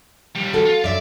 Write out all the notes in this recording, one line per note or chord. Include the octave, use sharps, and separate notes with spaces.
D#2 G3
F#4 A4
F4
F#2 D5 E5